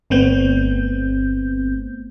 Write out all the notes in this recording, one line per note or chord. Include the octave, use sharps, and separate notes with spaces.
G1 A3 B3 C4 G6